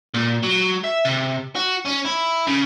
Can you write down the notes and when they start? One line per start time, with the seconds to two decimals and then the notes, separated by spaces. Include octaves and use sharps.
0.14 A#2
0.43 F#3
0.84 E5
1.05 C3
1.56 F#4
1.86 C#4
2.06 E4
2.47 C#3